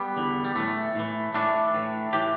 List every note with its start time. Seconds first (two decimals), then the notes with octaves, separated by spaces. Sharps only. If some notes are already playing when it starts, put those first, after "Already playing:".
Already playing: G3 B3
0.17 E2 D3
0.44 G3
0.55 A2 E3 A3
0.95 A2 E3
1.34 A2 E3 A3 D4
1.75 A2 E3
2.13 A2 E3 G4